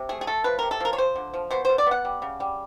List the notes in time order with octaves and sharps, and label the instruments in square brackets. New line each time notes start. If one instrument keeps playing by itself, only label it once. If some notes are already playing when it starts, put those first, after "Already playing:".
Already playing: [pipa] C3
A3 G#4
G#4
A3 A4
F3 B4
C3 A#4
A4
F3 A#4
C#5
F3 C5
D3
F3
B2 C5
B2 C5
D5
B3 F#5
G3
C#3
G3